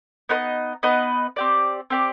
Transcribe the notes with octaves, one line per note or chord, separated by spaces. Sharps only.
B3 D#4 B4 D#5
B3 D#4 B4 D#5
C4 G4 D5
C4 G4 D5